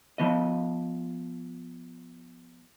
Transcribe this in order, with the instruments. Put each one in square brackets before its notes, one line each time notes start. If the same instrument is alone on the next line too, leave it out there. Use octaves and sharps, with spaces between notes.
[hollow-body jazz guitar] F3 B3 D#5